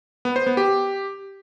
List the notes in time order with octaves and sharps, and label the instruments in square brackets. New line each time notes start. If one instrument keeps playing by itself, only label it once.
[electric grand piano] B3
C5
B3
G4